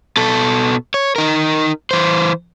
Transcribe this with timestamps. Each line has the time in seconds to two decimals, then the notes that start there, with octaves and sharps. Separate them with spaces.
0.17 B2 A4
0.94 C#5
1.16 D#4 A#4
1.91 E3 C5